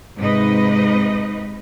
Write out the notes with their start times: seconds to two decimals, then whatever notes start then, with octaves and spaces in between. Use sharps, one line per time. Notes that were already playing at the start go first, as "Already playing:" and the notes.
0.18 G#2 C3 D#4 B4 D#5